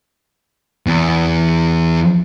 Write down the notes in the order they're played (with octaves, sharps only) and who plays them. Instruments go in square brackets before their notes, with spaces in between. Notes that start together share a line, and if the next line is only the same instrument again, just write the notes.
[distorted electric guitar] E2